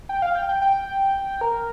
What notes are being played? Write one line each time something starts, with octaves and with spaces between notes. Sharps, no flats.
G5
F5
G5
G5
G5
A#4